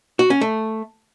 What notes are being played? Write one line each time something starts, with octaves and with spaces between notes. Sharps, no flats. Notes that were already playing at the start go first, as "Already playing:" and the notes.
F#4
C#4
A3